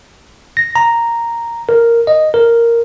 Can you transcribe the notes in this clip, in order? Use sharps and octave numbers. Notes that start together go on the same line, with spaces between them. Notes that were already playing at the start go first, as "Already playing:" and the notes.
A#6
A#5
A#4
D#5
A#4